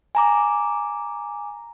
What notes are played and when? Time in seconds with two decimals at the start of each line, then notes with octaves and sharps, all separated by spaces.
0.15 G#5 A#5 D6